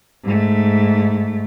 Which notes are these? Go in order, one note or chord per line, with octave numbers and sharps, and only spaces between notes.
G#2 A3